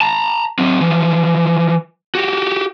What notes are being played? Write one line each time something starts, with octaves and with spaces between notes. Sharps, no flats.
A5 A#5
F#3 C4
E3 F3
F#4 G4